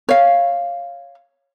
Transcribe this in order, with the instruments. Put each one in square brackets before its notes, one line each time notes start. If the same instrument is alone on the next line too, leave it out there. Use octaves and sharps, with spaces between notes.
[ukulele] C#5 F5